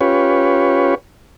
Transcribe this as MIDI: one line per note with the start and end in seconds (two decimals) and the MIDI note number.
0.01 0.95 61
0.01 0.95 65
0.01 0.95 67
0.01 0.95 71
0.01 0.95 73